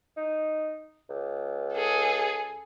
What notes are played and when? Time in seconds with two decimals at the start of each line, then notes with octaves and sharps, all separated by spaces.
0.17 D#4
1.09 C#2
1.74 G#4 A4